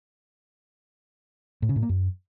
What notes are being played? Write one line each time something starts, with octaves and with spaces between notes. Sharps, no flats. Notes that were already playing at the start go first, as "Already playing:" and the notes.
A2
C#3
A2
A#3
F#2